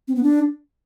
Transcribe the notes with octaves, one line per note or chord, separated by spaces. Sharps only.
C4
B3
D4